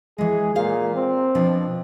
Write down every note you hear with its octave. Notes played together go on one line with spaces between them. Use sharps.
E3 G#3 G#4
A#2 G#4 C5 F5
C4
B2 F3 D4